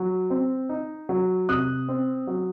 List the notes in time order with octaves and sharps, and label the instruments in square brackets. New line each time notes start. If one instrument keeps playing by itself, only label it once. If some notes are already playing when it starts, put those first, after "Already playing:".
Already playing: [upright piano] F#3
C4
D#4
F#3
C3 D#6 F#6
C4
F#3